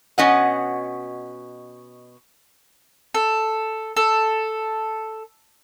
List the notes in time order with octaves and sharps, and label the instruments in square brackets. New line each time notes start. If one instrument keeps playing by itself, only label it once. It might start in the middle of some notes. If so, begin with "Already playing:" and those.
[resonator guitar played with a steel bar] B2 C#4 D#5 F#5
[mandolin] A4
A4